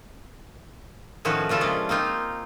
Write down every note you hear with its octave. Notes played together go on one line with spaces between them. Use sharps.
A2 D#3 F3 C#4 F#4 B4
A#2 C#3 F4 A4
C3 G#3 C#4 D4 D5
A#3 C4 D#4 F4